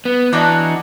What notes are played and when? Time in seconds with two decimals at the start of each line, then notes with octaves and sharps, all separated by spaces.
0.05 B3
0.33 E3 D4 D#4 F#4